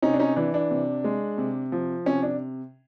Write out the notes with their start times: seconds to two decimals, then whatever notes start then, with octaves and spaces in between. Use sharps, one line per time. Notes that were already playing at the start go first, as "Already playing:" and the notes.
0.02 C3 C#4 D#4
0.14 D4
0.19 C#4 D#4
0.36 E3 D4
0.54 D4
0.71 C3
1.04 G#3
1.38 C3
1.72 F3
2.06 C3 C#4
2.23 D4